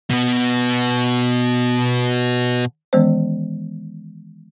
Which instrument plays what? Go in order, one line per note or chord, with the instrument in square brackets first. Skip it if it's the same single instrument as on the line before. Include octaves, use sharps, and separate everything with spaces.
[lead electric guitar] B2 B3
[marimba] D#3 E3 G#3 B3 C#4 C5